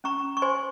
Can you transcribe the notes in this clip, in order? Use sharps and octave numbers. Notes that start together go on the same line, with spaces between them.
C#4 A#5 C#6
C#6
C5 G#5 C6